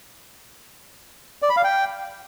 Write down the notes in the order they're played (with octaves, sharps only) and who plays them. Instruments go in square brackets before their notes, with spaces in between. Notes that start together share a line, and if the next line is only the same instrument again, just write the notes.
[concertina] D5
B5
F5
G5